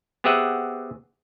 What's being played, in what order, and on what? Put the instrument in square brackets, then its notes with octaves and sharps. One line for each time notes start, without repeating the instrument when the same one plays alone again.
[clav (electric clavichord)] B3 C4 G4 G#4 E5 F#5